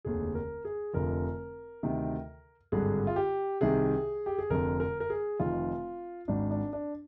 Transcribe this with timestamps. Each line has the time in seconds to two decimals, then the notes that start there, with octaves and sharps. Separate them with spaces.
0.05 F1 D#2 D3 G#4
0.35 A#4
0.65 G#4
0.93 F1 F2 D3 A#4
1.83 D2 C3 D#3
2.72 G#1 G2 D3 G#4
3.07 F4
3.16 G4
3.61 C2 C3 D#3 G#4
4.26 G4
4.38 G#4
4.50 F1 F2 D3 A#4
4.80 A#4
5.00 A#4
5.10 G#4
5.40 F1 F2 D#3 F4
6.28 G#1 G#2 D#3 D4
6.51 D4
6.73 D4